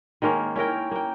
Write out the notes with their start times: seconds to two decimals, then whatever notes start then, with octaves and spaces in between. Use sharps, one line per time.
0.22 D#3 G#3 A#3 C#4
0.56 C#4 E4 A#4 G5
0.91 A#3 G5